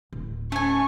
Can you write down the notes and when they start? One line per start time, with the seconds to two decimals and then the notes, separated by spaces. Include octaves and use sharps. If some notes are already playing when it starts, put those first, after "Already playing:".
0.13 D1
0.52 A3 C#4 G#5 C#6